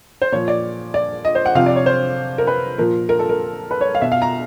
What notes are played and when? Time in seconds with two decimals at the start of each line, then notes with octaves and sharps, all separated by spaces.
0.22 C5
0.32 A#2 F3 C#5
0.48 D5
0.94 D5
1.25 D#5
1.35 C5
1.46 F#5
1.55 C3 F3 F5
1.66 D5
1.76 C#5
1.86 C5
2.38 A#4
2.47 B4
2.78 A#2 F3 A#4
3.09 A#4
3.19 A4
3.29 A#4
3.71 B4
3.81 C#5
3.95 F5
4.02 B2 E5
4.12 F5
4.22 A#5